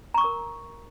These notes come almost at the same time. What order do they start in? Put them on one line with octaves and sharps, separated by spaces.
A#5 C#6 D#6 A#4